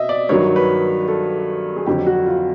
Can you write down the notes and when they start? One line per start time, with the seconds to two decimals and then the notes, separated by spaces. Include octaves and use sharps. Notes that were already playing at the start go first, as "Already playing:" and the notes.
Already playing: B2 D#5 E5
0.09 D5
0.29 G2 D#3 F#3 C#5
0.56 B4
1.08 A4
1.76 G#4
1.86 F2 D3 F#3 G4
2.07 F#4
2.26 F4